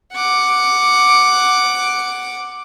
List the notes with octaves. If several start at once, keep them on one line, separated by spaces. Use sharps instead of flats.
F#5 D6